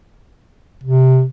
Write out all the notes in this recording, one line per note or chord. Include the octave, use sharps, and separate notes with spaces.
C3